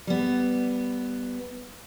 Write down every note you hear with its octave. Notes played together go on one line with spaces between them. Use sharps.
G3 B3